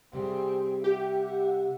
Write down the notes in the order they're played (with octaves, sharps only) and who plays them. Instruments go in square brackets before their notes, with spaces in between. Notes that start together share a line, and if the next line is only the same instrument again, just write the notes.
[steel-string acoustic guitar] C3 G3 [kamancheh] C4 G#4
[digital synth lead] G4 [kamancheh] E5 F#5